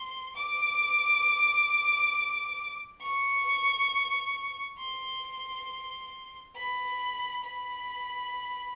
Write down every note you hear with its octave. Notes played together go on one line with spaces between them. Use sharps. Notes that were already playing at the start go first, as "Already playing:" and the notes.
Already playing: C6
D6
C#6
C6
B5
B5